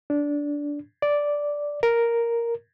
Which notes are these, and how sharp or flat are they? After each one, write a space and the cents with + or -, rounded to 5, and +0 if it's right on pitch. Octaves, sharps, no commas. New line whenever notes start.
D4 -15
D5 -5
A#4 +0